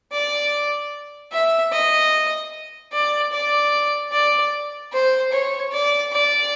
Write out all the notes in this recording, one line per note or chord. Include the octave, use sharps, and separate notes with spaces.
D5
E5
D#5
D5
D5
D5
C5
C#5
D5
D5